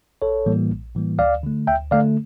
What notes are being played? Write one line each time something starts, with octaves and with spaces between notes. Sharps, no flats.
A#1 A4 C#5
A2 E3 G3 A#3
A#1
A2 E3 G3 A#3
D2 D5 F5
D3 A3
D2 E5 G5
D3 A3 D5 F5